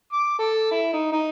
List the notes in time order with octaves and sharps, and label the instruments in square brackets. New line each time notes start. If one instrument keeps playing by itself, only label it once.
[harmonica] D6
A4
E4
D#4
D#4